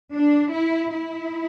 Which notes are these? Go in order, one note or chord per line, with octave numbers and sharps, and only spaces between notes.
D4
E4
E4